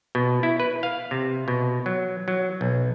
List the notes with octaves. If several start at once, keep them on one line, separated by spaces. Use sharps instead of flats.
B2
E4
B4
F5
C3
B2
F#3
F#3
B1